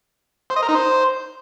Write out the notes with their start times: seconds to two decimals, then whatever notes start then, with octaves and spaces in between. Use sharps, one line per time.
0.50 C5
0.56 D#5
0.62 A#4
0.69 D#4
0.75 C5